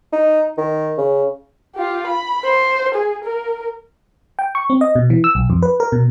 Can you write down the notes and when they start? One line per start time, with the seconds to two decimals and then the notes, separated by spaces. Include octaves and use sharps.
0.13 D#4
0.58 D#3
0.98 C#3
1.75 F4 G4
2.06 B5
2.44 C5
2.95 G#4
3.24 A#4
4.39 G5
4.55 C#6
4.70 C4
4.81 D#5
4.95 B2
5.10 E3
5.24 E6
5.35 B1
5.50 F2
5.63 B4
5.80 A#4
5.92 B2